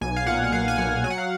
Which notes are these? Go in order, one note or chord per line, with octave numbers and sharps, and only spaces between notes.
B1 G#5
F5
A#2 F#5
F#5
B1 F5
G#5
B1 F#5
F#3 G#5
F#5
F5